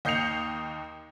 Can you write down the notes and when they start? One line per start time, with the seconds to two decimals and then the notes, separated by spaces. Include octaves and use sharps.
0.05 D#2 D#5 G6 C7 C#7 F7